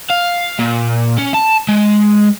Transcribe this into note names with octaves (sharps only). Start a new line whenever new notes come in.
F5
A#2
C#4
A5
G#3